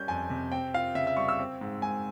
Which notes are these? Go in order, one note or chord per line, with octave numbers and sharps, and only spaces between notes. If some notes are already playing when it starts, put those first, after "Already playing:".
Already playing: G3 C#4 G6
F2 G#5
C3
C4 G5
F4 F5
C#3 E5
E5
G3 C#6
E6
C4
G#2
G#2 G#5